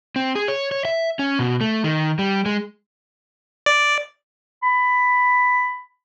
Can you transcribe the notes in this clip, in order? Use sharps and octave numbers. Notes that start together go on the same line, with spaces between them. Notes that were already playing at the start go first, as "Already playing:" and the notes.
C4
G#4
C#5
C#5
E5
C#4
B2
A3
D#3
G3
G#3
D5
B5